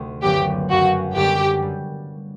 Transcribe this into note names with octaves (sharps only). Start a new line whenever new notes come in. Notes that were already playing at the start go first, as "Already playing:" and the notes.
Already playing: D2 C3 D#3 A3
G1 F#2 D3 F#3 B3 G4
G1 F#2 C#3 F#4
F#2 D3 G3 B3 D4 G4
G3